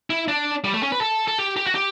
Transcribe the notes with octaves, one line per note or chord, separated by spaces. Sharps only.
E4
D4
G3
A3
C#4
B4
A4
A4
G4
G4
F#4
G4